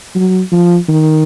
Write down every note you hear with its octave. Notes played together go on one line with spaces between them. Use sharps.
F#3
F3
D#3